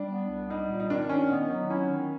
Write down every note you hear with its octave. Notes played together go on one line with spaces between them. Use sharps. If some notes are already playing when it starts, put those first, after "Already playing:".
Already playing: G3 D4
B3
C2
G3 D#4
A#2
D#4
D#3 D4
D#3 C#4
B3 D#4
F#3 D#4
C#4 E4
D#3